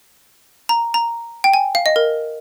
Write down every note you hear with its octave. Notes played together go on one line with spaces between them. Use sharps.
A#5
A#5
G5
G#5
F5
D#5
A#4